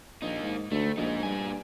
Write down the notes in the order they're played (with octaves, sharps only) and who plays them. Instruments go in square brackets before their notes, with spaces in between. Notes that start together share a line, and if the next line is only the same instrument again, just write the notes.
[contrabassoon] A#1 [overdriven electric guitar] A#3 D#4
[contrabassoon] G#2
[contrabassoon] D2 [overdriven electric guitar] A3
[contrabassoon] A#1 [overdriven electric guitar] G#3 D#4
[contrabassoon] G2 [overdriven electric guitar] A#2 G#5